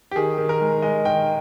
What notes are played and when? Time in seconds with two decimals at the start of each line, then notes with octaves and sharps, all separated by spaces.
0.11 G4
0.16 D#3 G#4
0.38 D#3
0.49 A#4
0.61 G#3
0.82 G#3 D#5
1.05 D#3 G5